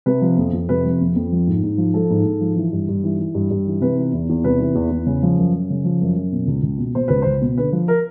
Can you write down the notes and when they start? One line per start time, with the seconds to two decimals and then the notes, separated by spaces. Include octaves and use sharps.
0.06 C3 B4
0.22 F3
0.38 F2
0.53 F2
0.69 C3 B4
0.85 F3
1.01 F2
1.16 F2
1.32 F3
1.47 G#2
1.63 G#2
1.78 F3
1.94 F3 A4
2.10 G#2
2.25 G#2
2.41 F3
2.56 E3
2.73 G2
2.88 G2
3.03 E3
3.19 E3
3.35 G2
3.51 G2
3.67 E3
3.81 C3 B4
3.97 E3
4.13 E2
4.29 E2
4.44 C3 B4
4.59 E3
4.75 E2
4.91 E2
5.07 C#3
5.23 F3
5.38 F#2
5.53 F#2
5.70 C#3
5.85 F3
6.01 F#2
6.16 F#2
6.32 B2
6.47 C#2
6.63 C#2
6.79 B2
6.95 B2 C5
7.08 C#2 B4
7.22 C#2 C5
7.42 B2
7.58 D3 B4
7.72 F3
7.88 A#4